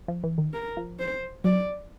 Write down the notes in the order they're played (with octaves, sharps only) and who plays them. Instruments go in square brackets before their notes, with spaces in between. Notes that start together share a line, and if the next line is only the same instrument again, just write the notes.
[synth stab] F3
E3
D#3
[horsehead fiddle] A#4
[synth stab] F3
[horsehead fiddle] C5
[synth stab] F#3 [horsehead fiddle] D5